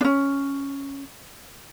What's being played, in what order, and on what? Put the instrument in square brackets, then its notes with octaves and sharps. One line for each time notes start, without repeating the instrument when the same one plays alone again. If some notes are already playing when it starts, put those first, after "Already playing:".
[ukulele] C#4 D4